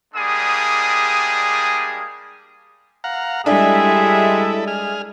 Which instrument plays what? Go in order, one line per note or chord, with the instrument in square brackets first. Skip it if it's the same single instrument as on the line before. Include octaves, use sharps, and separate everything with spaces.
[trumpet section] G3 G#3 A#3 D4 G#4 D#6
[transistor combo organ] F5 F#5 A#5
[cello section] G3 G#3 E5 [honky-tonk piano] D4 [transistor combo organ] E4 A4 [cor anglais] G#4
[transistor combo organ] G#4 F6